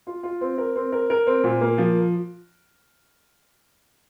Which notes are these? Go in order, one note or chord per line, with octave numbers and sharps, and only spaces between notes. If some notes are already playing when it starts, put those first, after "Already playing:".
F4
F4
C4
A#4
C4
A#4
A#4
C4
A#2
A#3
F3